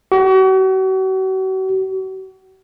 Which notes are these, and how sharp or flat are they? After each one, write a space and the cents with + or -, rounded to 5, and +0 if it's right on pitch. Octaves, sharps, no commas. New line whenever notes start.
F#4 +40